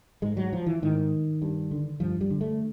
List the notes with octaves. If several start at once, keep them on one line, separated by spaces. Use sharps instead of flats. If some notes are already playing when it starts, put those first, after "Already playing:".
G#2 G#3
F#3
F3
E3
G#2 D#3
G2
D3
G2 F3
G3
D3
A3